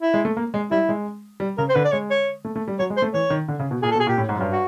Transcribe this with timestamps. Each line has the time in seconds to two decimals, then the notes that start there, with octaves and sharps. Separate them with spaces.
0.02 E4
0.14 G#3
0.25 A3
0.37 A#3
0.54 G#3
0.71 G3 E4
0.89 G#3
1.40 G3
1.58 C#3 A#4
1.69 C5
1.75 D3 B4
1.85 D5
1.92 G#3 C#5
2.10 C#5
2.45 A3
2.56 A3
2.68 G3
2.79 F#3 C#5
2.90 G#3
2.97 C5
3.02 A3
3.13 E3 C#5
3.30 D#3
3.48 D3
3.60 C#3
3.71 B2
3.82 A#2 G#4
3.91 A4
3.95 B2
4.00 G#4
4.07 A#2 G4
4.18 A2
4.29 G#2
4.36 F#2
4.41 G2
4.52 F#4